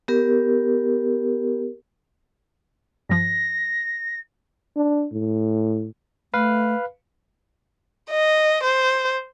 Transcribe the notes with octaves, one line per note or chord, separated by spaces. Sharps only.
B3 G4 A#4
G2 F3 A#6
D4
A2
A3 B4 F5
D#5
C5